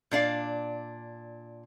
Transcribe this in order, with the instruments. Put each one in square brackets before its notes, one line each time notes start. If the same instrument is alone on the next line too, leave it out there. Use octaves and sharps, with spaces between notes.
[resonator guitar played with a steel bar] A#2 D4 D5 F5